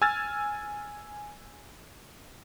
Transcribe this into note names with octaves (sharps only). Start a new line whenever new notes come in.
G#5 E6 F6 G#6 A6